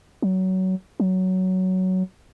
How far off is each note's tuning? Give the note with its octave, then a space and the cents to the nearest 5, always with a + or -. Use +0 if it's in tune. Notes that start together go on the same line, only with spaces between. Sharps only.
F#3 +20
F#3 +10